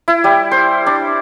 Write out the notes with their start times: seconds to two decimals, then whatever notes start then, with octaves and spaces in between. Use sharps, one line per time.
0.08 E4
0.24 G3
0.52 C5
0.86 D4